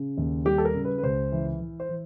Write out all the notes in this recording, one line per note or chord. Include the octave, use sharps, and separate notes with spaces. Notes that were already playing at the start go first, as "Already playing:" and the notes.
Already playing: C#3
D#2
G3 G4
A4
A#4
C#3
B4
B4
C#2 C5
E3
E3
C5
E3